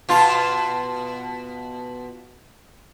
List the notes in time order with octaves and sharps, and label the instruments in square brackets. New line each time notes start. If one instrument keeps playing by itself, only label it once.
[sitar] B2 F4